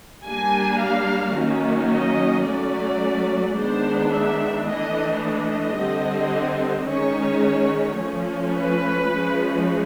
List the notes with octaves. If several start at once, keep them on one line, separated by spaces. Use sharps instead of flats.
G3 A#3 D4 G#5
F5
D#3 F#3 A#3 C#4
D#5
F#3 A3 C#4 D5
D#3 G#3 B3 D4 C5
E5
E3 A3 D4 D#5
D#5
D3 G3 C4
D#3 G#3 C#4 C#5
F3 A3 C#4
B4
F3 G#3 C#4